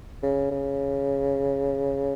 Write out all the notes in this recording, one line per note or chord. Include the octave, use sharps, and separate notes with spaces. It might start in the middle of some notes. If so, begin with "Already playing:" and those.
C#3
C#3